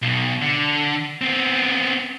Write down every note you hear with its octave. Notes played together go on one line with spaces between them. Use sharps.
B1 B2
D3
B3 C4